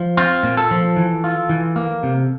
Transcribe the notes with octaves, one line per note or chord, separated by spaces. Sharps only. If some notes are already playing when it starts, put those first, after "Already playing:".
Already playing: F3
C4 F4
A#2
A4
F3
E3
F4
E3
A#3
C3